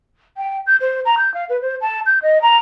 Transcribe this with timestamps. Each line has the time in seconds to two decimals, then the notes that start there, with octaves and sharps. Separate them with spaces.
0.37 G5
0.67 G6
0.81 C5
1.05 A#5
1.18 G6
1.34 F5
1.49 B4
1.61 C5
1.81 A5
2.06 G6
2.22 D#5
2.42 A#5